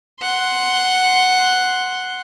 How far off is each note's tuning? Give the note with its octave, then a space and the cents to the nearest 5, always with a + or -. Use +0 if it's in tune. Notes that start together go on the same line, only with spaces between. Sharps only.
F#5 +0 C6 +0